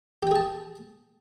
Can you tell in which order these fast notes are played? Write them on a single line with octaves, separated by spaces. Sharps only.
G4 G5 G#4 A5